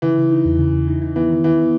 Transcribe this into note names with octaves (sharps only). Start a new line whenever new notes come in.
C#3 E3
C#3
D#4
E2
C#3
E2
D#4
D#4
E3 B3
D#3
D#2 E3
B3